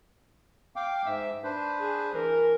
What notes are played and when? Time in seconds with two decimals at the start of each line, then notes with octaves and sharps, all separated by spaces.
0.76 F5 G5 D6
1.06 G#2 E5 E6
1.44 D4 B4 C5
1.80 G#4
2.13 E3 A#4